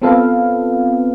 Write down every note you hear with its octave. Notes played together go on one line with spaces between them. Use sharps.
B3 C4 F4 A4 B4 F5